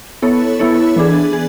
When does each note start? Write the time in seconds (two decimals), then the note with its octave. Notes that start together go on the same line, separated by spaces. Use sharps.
0.22 B3 E4 A4 C#5
0.59 B3 E4 A4 C#5
0.96 E3 B3 D4 G#4
1.33 G#4